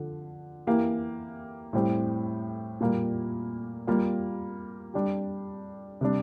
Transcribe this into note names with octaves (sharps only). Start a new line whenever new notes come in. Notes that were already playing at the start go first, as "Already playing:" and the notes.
Already playing: D3 F3
E3 A#3 E4 G4
A2 G3 C4 G4
A#2 G3 A#3
G3 A#3 F4
G3 D4 G4
C3 G3 D4